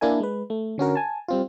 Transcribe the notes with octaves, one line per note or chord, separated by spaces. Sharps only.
A#3 D4 E4 A#4 G#5
G#3 B4
A3
D3 C#4 F#4 A#4
G#5 A5
G3 C4 F4